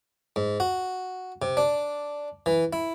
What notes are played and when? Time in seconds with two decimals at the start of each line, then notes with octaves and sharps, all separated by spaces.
0.36 G#2
0.60 F#4
1.42 C3
1.57 D4
2.46 E3
2.73 E4